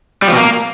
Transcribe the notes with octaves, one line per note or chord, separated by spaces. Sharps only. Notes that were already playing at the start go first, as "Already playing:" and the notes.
G3
F3
B2
A#3